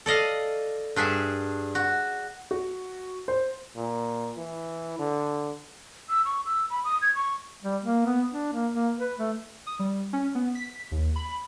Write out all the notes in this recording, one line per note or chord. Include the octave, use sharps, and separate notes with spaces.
A4 D5 D#5 F5
G2 D4 G#4 E5
F#4
F#4
C5
A#2
E3
D3
E6
C#6
E6
B5
D#6
G#6
C#6
G3
A#3
B3
D4
A#3
A#3
B4
A3
D#6
G3
C#4
B3
B6
D#2
B5